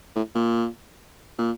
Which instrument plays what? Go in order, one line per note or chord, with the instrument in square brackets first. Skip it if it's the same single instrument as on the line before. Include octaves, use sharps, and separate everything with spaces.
[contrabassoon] A2
A#2
A#2